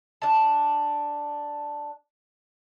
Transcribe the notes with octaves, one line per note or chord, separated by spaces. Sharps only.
D4 A5